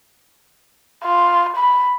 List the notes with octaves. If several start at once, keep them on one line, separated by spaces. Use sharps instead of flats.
F4
B5